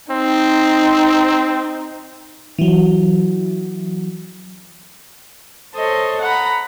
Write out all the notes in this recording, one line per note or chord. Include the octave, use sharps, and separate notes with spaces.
C4 D#4
E3 F#3
A4 C5 C#5 D#5
F#5 A#5 B5